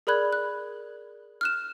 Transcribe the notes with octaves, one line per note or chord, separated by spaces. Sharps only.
G#4 A#4 D5 B5 F#6 G#6
F#6
F6 F#6 E7